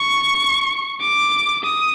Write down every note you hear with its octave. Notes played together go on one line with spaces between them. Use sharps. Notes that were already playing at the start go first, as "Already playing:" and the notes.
Already playing: C#6
D6
D#6